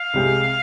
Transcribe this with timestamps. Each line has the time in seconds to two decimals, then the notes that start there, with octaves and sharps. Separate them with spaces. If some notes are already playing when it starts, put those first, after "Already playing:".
Already playing: F5
0.14 C2 C3 G#3 C4 G#4